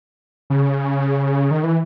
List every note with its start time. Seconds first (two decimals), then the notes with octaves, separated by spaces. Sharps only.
0.50 C#3
1.51 D#3
1.63 E3